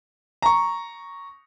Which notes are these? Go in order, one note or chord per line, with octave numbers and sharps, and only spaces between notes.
A#5 C#6